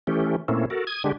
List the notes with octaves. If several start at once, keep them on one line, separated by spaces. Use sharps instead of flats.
E3 A3 C#4 G4
A#2 A3 A#3 C4 C#4 E4
F#4 A4 A#4
D#6 G#6
D3 G#3 D4 G4